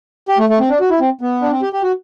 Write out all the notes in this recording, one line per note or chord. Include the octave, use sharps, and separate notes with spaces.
G4
A3
A3
C4
D4
F#4
E4
C4
B3
D4
C4
G4
G4
F#4